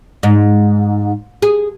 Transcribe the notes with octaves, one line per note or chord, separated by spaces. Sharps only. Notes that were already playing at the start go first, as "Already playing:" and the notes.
G#2
G#4